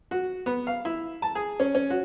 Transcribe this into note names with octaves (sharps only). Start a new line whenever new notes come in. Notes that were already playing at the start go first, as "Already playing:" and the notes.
F#4
B3
F5
E4
A5
G#4
C#4
C#4
F#4